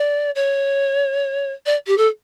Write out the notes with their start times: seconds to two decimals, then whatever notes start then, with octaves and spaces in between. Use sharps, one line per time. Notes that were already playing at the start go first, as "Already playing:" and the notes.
Already playing: D5
0.35 C#5
1.66 D5
1.87 G4
1.97 A4